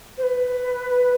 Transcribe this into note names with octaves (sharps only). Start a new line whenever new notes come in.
C5
B4